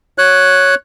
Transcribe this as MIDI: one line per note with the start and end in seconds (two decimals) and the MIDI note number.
0.18 0.75 73
0.18 0.75 90